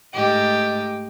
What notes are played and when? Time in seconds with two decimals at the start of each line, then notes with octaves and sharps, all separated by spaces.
0.14 G#2 A3 G4 D#5